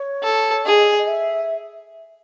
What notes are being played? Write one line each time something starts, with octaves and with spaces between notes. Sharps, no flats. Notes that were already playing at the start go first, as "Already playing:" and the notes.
Already playing: C#5
A4
G#4 D#5
D#5
E5